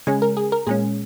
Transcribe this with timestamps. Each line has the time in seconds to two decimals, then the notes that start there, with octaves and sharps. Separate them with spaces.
0.07 C#3 G#3 C#4 G#5
0.22 A#4
0.37 G#4
0.52 A#4
0.67 A#2 G#3 C#4 G#4